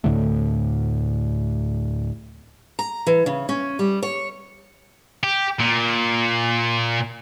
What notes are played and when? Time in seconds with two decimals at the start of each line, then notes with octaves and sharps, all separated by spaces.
0.04 D2 A2 D3 A3
2.79 A#5
3.07 E3
3.26 C#3
3.49 C#4
3.79 G3
4.03 C#5
5.23 G4
5.60 A#2